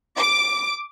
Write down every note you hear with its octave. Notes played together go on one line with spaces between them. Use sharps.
D6